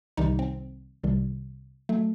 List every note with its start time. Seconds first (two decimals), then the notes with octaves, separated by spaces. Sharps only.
0.17 C2 C3 D#3 G3 D#4
0.39 C4
1.03 C2 C3 D#3 G3
1.89 F#3 A3